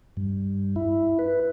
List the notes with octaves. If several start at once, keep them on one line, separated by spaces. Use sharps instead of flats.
G2
E4
B4